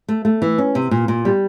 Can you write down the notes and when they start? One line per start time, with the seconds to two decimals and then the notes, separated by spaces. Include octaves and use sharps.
0.08 A3
0.25 A3
0.42 E3
0.58 C#4
0.75 C3
0.91 A#2
1.08 A#2
1.25 G3